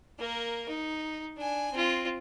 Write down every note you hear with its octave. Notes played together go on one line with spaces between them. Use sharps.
A#3 A#4
D#4
D4 G#5
C4 F4